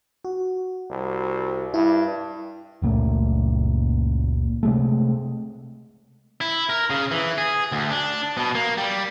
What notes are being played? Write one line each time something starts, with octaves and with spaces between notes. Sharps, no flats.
F#4
C2
G2 E4
F#1 C#2 A#2 A3
C3 G#3 A3
E4
A#4
C#3
E3
G#4
D2
D4
B2
A#3
G3